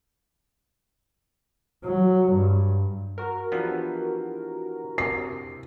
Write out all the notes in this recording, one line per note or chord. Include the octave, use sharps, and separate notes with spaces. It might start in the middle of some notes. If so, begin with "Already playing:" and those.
F#3
G2
F#4 A#4
E3 F3 B3 D4 E4 G4
C3 C7